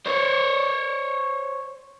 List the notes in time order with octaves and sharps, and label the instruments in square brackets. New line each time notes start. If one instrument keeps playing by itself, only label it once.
[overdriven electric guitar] C5 C#5